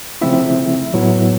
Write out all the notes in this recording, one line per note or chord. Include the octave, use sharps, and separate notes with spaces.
C#3 F3 A3 C4 E4 E5
A2 F#3 B3 E4